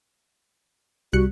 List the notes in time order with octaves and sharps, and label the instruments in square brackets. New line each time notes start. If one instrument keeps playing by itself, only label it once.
[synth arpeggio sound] C2 F#6 C#7 [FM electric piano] G3 [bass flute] F#4